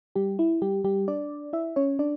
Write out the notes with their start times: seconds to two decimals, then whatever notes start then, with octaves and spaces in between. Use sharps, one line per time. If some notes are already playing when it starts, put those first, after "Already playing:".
0.15 G3 G4
0.39 E4
0.62 G3 G4
0.84 G3 G4
1.08 D4 D5
1.53 E4 E5
1.76 C#4 C#5
1.99 D4 D5